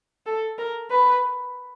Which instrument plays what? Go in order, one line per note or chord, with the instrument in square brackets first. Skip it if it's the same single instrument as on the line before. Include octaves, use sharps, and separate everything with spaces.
[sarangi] A4
A#4
B4